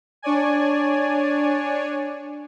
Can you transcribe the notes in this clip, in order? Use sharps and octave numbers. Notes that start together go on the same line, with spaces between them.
D4 C#5 D5 G#5